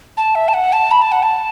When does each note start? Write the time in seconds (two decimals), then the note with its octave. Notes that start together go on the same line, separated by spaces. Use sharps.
0.17 A5
0.35 E5
0.48 A5
0.54 F#5
0.73 A5
0.91 B5
1.02 A5
1.12 F#5
1.23 A5